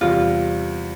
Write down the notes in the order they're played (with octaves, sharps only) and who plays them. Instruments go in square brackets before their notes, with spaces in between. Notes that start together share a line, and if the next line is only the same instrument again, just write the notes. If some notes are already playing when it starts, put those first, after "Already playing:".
[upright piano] E2 C3 G3 [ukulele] F4